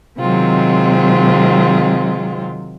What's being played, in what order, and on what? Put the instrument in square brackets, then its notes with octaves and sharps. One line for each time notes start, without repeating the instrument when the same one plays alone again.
[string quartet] C3 D#3 F#3 G#3 C4 F4